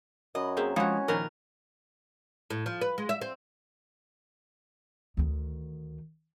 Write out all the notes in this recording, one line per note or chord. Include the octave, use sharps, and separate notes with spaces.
F#2 D#5 B5
A#3 C4 G#4 E5
F3 G#3 C#4 E4 F#4
A#2 D#3 F3 A#4 B4
A2
F3
B4
G#3
E5
C4
D2 D#3